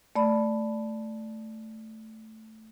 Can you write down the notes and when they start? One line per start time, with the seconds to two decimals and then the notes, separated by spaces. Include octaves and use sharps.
0.16 A3 D5 B5